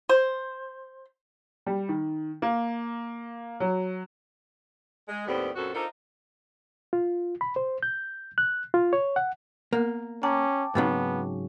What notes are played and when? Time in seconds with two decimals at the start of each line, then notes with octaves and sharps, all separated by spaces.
0.09 C5
1.66 G3
1.89 D#3
2.42 A#3
3.60 F#3
5.08 G#3
5.27 D#2 A2 G3 B3 C4
5.55 F#2 A#2 C4 F#4 A4
5.74 D4 D#4 F4 A4 A#4 C5
6.93 F4
7.41 B5
7.56 C5
7.83 G6
8.38 F#6
8.74 F4
8.93 C#5
9.16 F#5
9.73 A#3 B3 A#4
10.23 C#4 G5 A5 A#5 D6
10.75 G#2 C#3 F#3 B3 C4 D#4